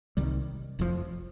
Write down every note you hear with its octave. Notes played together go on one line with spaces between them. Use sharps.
C2 C3 D#3 G3
F1 F2 C3 F3